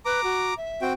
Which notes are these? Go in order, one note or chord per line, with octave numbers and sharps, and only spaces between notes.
B4 A#5 D6
F#4
E5
C4 F#4 G5